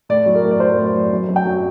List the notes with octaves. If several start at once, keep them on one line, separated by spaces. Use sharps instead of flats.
A2 D5
F#3
A#4
A2
D5
F#3 C5
A2
D5
F#3
F#2
F#2
G5
F#3